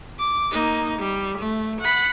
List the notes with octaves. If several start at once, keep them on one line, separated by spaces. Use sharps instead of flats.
D6
A#3 D#4
G3
A3
F#5 B5